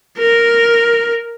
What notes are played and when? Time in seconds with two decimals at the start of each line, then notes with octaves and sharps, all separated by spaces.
0.18 A#4